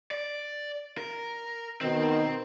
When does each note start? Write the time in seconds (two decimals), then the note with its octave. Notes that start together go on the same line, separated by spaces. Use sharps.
0.11 D5
0.98 A#4
1.81 B2 D#3 C4